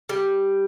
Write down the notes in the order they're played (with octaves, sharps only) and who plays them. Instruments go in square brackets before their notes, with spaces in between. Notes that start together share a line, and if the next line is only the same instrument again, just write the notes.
[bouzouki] G3